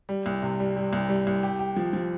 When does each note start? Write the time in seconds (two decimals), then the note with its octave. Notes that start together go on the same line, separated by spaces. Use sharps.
0.09 G3
0.26 C2
0.42 C3
0.60 G3
0.76 G3
0.93 C2
1.09 G3
1.27 C2
1.43 G4
1.59 G4
1.76 F3
1.93 F3